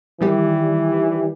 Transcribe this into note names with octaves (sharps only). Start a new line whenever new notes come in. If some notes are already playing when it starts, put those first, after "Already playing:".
D#3 E3 G3 G4